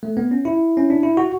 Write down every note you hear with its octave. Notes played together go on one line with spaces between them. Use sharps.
A3
B3
C#4
E4
C#4
D4
E4
F#4